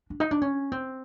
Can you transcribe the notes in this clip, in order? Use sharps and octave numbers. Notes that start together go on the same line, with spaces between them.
D4
D#4
D4
C#4
C4